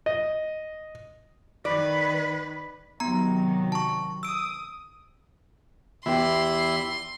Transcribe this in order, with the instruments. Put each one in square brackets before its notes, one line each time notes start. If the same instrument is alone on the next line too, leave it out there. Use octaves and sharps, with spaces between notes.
[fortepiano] D#5
[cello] D#3 B4 [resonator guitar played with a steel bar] D5
[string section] C3 D#3 F#3 [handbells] B3 A#5
[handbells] A5 C#6
[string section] D#6 [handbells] E6 D7
[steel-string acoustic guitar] E2 G4 [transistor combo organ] E4 [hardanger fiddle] C6